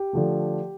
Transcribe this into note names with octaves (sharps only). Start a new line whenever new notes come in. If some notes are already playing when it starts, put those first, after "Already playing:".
Already playing: G4
D3 F3 A3